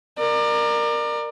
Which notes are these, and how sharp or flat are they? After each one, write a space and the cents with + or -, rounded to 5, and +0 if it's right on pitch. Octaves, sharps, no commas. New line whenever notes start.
A#4 +0 D5 +30